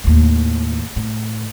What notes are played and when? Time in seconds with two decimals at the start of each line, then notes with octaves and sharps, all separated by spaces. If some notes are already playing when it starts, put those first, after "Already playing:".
0.04 D#2 A2
0.96 A2